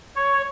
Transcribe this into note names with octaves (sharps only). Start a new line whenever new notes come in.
C#5